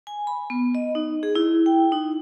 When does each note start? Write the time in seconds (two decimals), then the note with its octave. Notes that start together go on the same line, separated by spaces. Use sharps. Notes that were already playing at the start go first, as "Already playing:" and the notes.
0.07 G#5
0.27 B5
0.50 B3
0.75 D#5
0.95 D#4
1.23 G#4
1.35 E4
1.66 G5
1.92 D#4